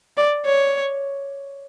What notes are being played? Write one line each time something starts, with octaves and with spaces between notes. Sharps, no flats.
D5
C#5